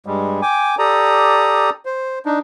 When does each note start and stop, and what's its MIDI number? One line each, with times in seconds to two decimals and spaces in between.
0.06 0.41 43
0.06 0.41 55
0.06 0.41 56
0.42 0.75 79
0.42 0.75 80
0.42 0.75 86
0.79 1.70 67
0.79 1.70 69
0.79 1.70 74
0.79 1.70 82
0.79 1.70 87
1.85 2.19 72
2.26 2.39 62
2.26 2.39 63